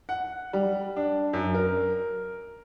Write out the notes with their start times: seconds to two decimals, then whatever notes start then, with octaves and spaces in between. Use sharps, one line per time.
0.09 F#5
0.53 G3
0.96 D4
1.33 F#2
1.54 A#4